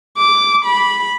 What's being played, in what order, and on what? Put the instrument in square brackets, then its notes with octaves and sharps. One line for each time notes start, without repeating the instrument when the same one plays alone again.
[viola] D6
B5